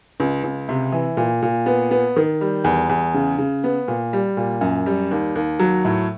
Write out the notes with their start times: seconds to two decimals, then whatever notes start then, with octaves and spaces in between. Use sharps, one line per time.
0.20 C#2
0.44 C#2
0.69 C3
0.92 E3
1.17 A#2
1.42 A#2
1.66 B3
1.91 B3
2.16 D#3
2.41 G3
2.64 E2
2.89 E2
3.14 C#3
3.38 C#3
3.64 B3
3.88 A#2
4.13 G3
4.37 A#2
4.61 F#2
4.86 G3
5.11 D#2
5.35 D#2
5.59 F#3
5.85 A2